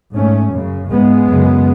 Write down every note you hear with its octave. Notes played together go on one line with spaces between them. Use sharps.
G#2 A3 C#4
F#2 C#3
G#2 G#3 B3
F#2 C#3